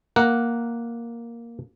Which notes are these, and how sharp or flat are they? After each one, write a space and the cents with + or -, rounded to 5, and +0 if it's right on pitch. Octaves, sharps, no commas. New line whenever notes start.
A#3 +0 A#4 +0 F#5 +0